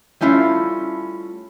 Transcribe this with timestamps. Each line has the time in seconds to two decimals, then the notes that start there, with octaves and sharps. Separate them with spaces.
0.21 G3 A3 C#4 E4 F4